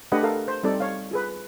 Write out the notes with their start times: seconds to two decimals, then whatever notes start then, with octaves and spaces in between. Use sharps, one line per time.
0.12 A3 D4 G4 B4 D#5 F#5
0.23 A4 A#4 F5
0.48 C5
0.63 G3 C4 D#4 A4 D5
0.80 C#5 F5
1.11 F4 G#4 B4